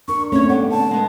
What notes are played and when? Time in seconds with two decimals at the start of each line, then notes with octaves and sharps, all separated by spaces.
0.08 D4 A#4 C#6
0.32 A3 A#3 C4 C#4 C#5 C#6
0.49 G3 B3 F#5
0.71 D3 A4 A5
0.91 G#3 B3